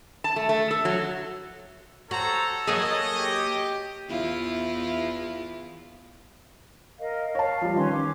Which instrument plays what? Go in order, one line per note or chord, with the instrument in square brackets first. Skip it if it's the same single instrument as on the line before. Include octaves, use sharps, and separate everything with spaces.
[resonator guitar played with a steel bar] A5
A3
A3
A4
F#3
[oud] F#4 [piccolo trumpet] A4 [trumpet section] C5 C#5 A#5
[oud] F#3 A#3 G#4 [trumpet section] C#5 D#5
[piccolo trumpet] G4
[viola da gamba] E2 E4 F4
[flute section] A#4 D#5 F5
[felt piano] C#5 A5 [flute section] F5
[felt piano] F3 G3
[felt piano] D#3 [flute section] C#4 B4 C6
[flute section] D6